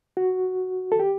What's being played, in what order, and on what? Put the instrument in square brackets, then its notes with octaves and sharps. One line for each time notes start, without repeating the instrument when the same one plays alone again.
[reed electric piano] F#4
A4
G4